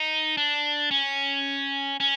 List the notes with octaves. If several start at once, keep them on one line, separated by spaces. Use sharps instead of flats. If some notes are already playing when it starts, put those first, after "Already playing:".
Already playing: D#4
D4
C#4
C#4